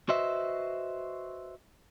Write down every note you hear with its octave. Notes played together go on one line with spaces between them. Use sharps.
F#4 B4 C5 D#5 E5